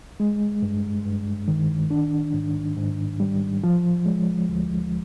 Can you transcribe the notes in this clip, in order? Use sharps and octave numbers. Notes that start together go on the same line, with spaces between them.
G#3
G2
G2
D#3
D4
G#2
G#2
G3
F3
G#3
D2